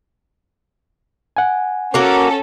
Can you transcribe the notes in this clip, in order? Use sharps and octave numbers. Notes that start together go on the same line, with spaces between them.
F#5 G#5
A#3 C#4 F#4 A4 A#4